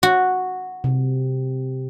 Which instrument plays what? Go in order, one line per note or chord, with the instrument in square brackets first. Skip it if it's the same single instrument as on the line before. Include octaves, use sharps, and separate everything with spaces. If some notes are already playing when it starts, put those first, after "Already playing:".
[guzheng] F#4
[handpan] C3